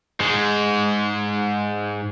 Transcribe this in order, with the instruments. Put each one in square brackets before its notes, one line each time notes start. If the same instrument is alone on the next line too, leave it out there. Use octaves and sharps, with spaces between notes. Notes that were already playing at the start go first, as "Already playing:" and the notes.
[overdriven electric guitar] G#2 G#3